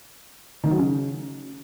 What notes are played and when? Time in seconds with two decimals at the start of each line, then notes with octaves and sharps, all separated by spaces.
0.64 D#3
0.71 F#3
0.78 C#3